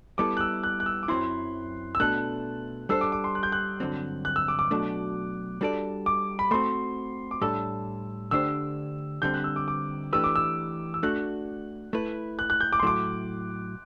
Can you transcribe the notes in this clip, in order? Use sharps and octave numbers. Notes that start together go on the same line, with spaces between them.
G3 B3 E4 A4 D6
F#6
E6
F#6
F#6
E6
D6
F#2 F#3 C4 E4 C6
E6
B2 A3 D4 A4 F#6
G3 D4 A4 C5 E6
D6
D6
C6
F#6
G6
F#6
G2 D3 F#3 C4
F#6
E6
D6
D6
B2 F#3 A3 D4
G3 D4 F#4 A4 D5
D6
B5
A3 C4 F#4 C6
D6
A2 G3 D4 A4 E6
D3 A3 D4 G4 C5 E6
D3 G3 C4 G6
F#6
E6
D6
D6
E3 A3 D4 G4 B4 E6
D6
E6
E6
A3 D4 F#4 F#6
A3 E4 B4
F#6
F#6
G6
D6
C6
A2 F#3 A3 E4 D6